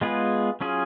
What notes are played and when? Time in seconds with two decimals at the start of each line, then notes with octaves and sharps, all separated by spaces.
0.01 G#3 B3 F4 G#4 B4
0.61 F#3 C#4 F4 G#4